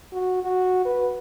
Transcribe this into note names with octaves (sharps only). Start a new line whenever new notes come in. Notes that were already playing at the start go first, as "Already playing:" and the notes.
F#4
F#4
B4